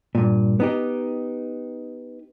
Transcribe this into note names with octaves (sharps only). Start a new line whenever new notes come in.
G2 A#2
B3 D#4 G4